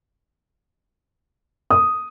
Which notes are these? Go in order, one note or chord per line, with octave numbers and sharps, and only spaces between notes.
D#6